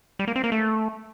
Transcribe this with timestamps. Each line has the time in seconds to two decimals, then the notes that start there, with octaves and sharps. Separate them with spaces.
0.19 G3
0.27 A#3
0.36 C4
0.44 A#3
0.52 A3